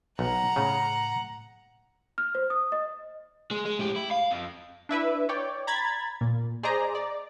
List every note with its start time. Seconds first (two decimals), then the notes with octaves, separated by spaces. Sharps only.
0.19 B1 F#5 A#5
0.56 A2 C#3
2.18 F6
2.35 C5
2.50 D#6
2.72 D#5
3.51 G#3
3.66 G#3
3.79 A2 G4
3.96 E4
4.11 F5
4.30 F2
4.89 D4 E4 B4 E5
5.29 C#5 D5 G5
5.67 A#5 B5 G#6 A6
6.21 A#2
6.63 G#4 C5 D5 D#5 A#5
6.95 D5